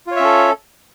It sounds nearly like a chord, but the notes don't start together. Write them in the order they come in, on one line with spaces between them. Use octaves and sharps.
F4 C#5 E5 C#4 A4